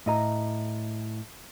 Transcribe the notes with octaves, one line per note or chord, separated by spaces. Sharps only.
A2 D#5 A#5